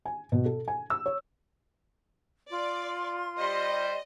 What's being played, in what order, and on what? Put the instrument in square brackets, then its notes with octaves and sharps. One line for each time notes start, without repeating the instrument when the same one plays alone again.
[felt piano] G#5
B2
A4
G#5
E6
C#5
[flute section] F4 C6 [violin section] D5
[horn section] G3 C5 [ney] D5 [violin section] D#5